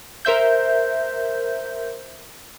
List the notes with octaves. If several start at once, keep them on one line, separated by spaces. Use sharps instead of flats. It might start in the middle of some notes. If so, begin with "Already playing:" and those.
A#4 C5 E5 G6